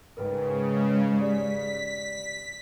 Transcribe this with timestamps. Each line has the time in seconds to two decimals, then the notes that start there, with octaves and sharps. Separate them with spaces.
0.17 G#2 C#3 A#4 B4 G5
1.20 G4 D5 B6